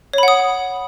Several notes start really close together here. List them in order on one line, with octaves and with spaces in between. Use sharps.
C#5 B5 F#5 D#6